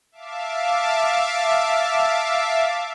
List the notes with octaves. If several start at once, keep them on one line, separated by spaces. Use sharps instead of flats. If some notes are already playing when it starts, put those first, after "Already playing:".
E5 F5 A5 D6